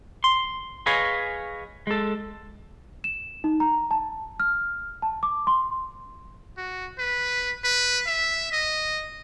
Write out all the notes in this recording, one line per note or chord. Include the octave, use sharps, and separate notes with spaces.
C6
G#4 B4 C#5 D#5 F5 G#5
G#3 A4
E7
D#4
A#5
A5
F6
A5
D6
C6
F#4
B4
B4
E5
D#5